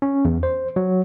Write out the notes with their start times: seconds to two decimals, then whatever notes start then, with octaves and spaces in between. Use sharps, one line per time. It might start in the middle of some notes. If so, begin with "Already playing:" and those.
0.02 C#4
0.25 E2
0.43 C5
0.76 F#3